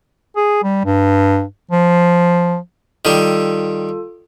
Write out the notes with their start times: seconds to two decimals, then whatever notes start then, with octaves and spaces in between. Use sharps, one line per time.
0.36 G#4
0.63 G3
0.85 G2
1.71 F3
3.05 D#3 G3 F4 A4